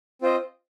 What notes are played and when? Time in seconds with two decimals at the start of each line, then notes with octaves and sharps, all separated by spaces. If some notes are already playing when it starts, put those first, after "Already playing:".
0.21 C4 F4 C5 D#5